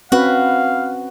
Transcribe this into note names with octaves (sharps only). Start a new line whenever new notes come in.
C4 C#4 F#4 B4 F5